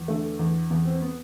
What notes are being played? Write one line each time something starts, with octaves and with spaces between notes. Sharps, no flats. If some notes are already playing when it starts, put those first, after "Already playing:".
Already playing: E2
D3 A3
E2
E2 B3
C4
B3